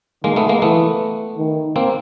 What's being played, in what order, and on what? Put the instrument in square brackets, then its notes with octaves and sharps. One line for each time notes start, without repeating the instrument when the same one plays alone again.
[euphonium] D#3 [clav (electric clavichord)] G#3 A#3
[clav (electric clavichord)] A3 B3
G#3 A#3
[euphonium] E3 [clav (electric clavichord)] A3 B3
[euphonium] D#3
[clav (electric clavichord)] A#3 C4